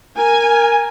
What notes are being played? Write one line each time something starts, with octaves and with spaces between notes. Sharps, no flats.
A#4 G#5